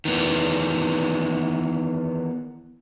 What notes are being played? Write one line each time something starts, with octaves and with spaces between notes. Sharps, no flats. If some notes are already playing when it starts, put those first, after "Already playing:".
D#3 E3 B3